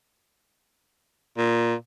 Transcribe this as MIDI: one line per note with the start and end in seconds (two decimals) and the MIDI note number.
1.37 1.74 46